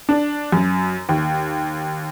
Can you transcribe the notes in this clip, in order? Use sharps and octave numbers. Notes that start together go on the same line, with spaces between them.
D4
F#2
D#2